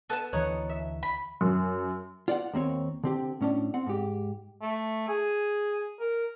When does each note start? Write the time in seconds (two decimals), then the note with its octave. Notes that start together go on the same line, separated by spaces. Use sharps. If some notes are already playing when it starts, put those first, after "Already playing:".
0.10 B3 A4 A5
0.33 D2 D3 E3 D#4 C#5 F#5
0.69 E5
1.03 B5
1.41 F#2
2.28 F4 D5 E5 F#5
2.53 D#2 A#3 C4 C#5
3.03 D3 C4 G4
3.41 A2 C#4 D4
3.74 C4 F#5
3.86 G#2 G4
4.62 A3
5.08 G#4
6.00 A#4